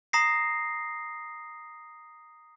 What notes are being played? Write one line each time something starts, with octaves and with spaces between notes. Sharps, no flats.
A#5 D#6 A#6 C7